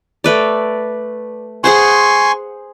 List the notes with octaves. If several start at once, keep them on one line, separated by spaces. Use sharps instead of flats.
A3 B4 D5
G#4 C5 F#5 G#5 C6 C#6